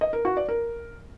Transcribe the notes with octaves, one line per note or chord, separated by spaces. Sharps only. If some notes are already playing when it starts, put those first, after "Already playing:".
D#5
A#4
F#4
D5
A#4